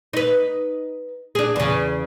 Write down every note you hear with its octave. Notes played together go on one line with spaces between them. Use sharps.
D#4 B4
D4 G#4
E2 C#3